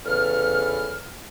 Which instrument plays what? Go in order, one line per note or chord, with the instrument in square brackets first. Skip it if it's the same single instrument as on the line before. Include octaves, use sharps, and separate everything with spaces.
[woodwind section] E2 C#3 A4 B4 F6